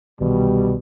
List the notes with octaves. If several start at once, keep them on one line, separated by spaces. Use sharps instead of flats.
C2 B2 D#3 E3 G3